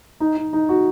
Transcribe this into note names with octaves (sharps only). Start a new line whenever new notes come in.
D#4
D#4
D#4
F#4